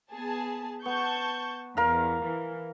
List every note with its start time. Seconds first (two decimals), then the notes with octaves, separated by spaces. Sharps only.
0.13 B3 G#4 A5
0.86 B3 A5 C#6 G6
1.77 E2 A#4 F5
2.25 E3